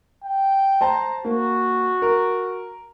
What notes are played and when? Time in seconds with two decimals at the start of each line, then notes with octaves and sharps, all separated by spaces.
0.24 G5
0.81 C5 A5 A#5
1.25 A#3 F#4
2.02 A#4